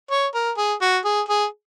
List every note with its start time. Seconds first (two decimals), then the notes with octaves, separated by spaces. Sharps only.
0.11 C#5
0.34 A#4
0.57 G#4
0.81 F#4
1.05 G#4
1.29 G#4